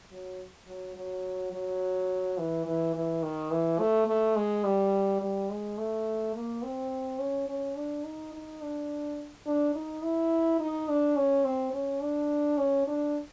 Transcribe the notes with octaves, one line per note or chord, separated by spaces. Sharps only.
F#3
F#3
F#3
F#3
E3
E3
E3
D#3
E3
A3
A3
G#3
G3
G3
G#3
A3
A#3
C4
C#4
C#4
D4
D#4
D#4
D4
D4
D#4
E4
D#4
D4
C#4
C4
C#4
D4
C#4
D4